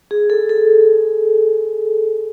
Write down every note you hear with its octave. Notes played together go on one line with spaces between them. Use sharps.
G#4
A4
A4